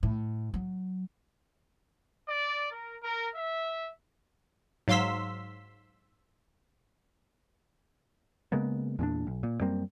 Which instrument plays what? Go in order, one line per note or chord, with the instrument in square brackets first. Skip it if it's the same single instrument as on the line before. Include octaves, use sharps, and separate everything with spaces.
[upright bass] A2
F#3
[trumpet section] D5
A#4
A#4
E5
[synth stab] G#2 F#3 F5 C6 E6 B6
[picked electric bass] C#3 G#3 A#3 B3
E2 A#2 D4
B1
A#2
F#2 G3 A#3 C4